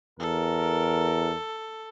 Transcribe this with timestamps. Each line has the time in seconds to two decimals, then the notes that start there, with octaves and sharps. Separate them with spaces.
0.20 E2 A4 A#4